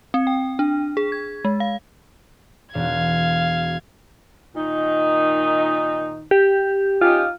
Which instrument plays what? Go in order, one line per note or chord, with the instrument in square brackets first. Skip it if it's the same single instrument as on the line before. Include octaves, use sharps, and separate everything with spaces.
[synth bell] C4
G5
D4
G#4
G#6
G#3
F5
[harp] E1 F#4 [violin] F5 G#6
[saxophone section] A#2 D#3 D#4
[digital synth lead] G4
[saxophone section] C#4 D#4 G4 [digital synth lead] F4